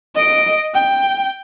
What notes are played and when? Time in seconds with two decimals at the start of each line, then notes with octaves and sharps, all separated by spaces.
0.15 D#5 D7
0.75 G5